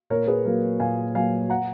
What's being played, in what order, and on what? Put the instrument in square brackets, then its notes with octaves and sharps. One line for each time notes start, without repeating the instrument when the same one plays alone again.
[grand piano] A#2 A#4 C#5
G#4 B4
F#3 A#3 A#4
A#2 F5 G#5
F#3 A#3 F5 G#5
F#5 A#5